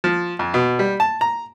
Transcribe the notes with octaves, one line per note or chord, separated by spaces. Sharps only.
F3
F2
B2
G3
A5
A#5